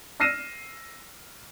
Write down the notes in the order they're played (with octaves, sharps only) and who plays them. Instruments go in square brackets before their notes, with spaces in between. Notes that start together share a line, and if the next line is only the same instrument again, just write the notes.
[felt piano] E6 F6 A#6 C7 D#7 E7